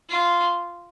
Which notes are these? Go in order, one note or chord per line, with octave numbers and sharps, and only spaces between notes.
F4